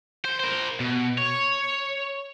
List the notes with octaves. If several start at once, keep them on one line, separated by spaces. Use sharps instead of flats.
C5
A#4 C5
B2
C#5